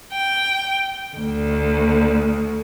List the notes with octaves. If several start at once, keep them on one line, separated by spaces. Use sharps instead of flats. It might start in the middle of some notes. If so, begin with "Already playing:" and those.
G5
D2